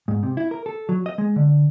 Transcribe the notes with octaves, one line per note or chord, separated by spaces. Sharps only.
G#2
C3
E4
A#4
A4
F#3
D#5
G#3
D3